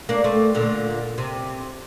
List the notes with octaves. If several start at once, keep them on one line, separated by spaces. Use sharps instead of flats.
A#3 D4
A3 C4
A#2 D3
C3